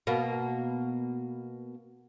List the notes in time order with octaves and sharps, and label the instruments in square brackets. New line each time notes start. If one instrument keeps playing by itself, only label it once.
[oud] B2 A#3 B3